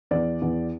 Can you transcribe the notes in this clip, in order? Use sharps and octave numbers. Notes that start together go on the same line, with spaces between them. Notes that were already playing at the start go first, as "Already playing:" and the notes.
E2 D5
E2